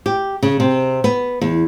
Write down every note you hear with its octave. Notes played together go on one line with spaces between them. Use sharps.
G4
C#3
C3
B3
E2